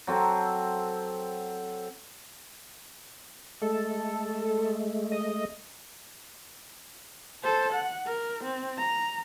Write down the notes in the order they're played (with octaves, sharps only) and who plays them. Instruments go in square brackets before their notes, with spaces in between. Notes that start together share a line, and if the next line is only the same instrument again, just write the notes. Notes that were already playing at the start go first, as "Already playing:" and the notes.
[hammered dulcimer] F#3 C4 A4
[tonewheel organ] G#3 A3 [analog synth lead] A4
[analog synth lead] D#5
[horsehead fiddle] A4 C5
F#5
A#4
C4
A#5